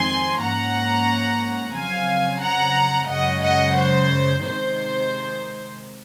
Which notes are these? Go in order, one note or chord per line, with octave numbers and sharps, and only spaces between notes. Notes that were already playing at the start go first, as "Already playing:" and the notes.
Already playing: F2 D#3 G#3 C4 G#5 C6
G#2 F3 A#3 C#4 F#5 A#5
F2 C#3 F#3 C4 F5 G#5
F#5 A#5
F#2 C#3 G#3 C#4 D#5 F#5
D#5 F#5
C5
C3 D#3 G#3 C5